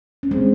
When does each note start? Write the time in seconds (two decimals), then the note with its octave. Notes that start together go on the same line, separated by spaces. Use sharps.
0.23 C#4
0.31 G#3 C4